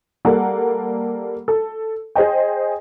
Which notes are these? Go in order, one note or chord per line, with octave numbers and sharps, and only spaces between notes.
G3 A#3 A4 F#5
A4
G#4 C5 D#5 G5